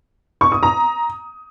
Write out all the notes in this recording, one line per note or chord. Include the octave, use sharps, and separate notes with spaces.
C#6
D#6
A#5